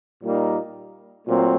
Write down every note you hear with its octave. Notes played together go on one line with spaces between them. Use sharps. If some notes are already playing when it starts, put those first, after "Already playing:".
A#2 G3 A#3 D#4
A#2 F#3 A3 C4